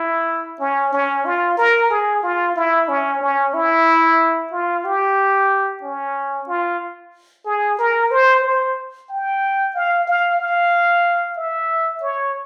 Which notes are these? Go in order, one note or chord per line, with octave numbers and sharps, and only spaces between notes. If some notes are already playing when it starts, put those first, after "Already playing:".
Already playing: E4
C#4
C#4
F4
A#4
G#4
F4
E4
C#4
C#4
E4
F4
G4
C#4
F4
G#4
A#4
C5
C5
G5
F5
F5
F5
E5
C#5